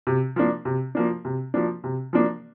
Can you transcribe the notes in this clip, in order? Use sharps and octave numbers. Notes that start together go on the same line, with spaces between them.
C3
F3 A#3 D4
C3
F3 A#3 D4
C3
F3 A#3 D4
C3
F3 A#3 D4